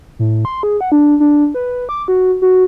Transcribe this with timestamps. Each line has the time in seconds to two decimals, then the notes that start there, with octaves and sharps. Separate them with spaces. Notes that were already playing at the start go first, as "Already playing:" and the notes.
0.19 A2
0.45 C6
0.63 G#4
0.81 F#5
0.92 D4
1.20 D4
1.54 B4
1.89 D6
2.08 F#4
2.42 F#4